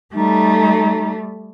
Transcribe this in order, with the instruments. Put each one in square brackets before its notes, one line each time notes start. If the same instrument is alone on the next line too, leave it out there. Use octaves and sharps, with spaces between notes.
[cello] G3 A3 [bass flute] D#4